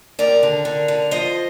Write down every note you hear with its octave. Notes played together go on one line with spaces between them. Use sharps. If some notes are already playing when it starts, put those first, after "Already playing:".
D#2 A#4 D5
D3
D3
D3
F3 C5 D#5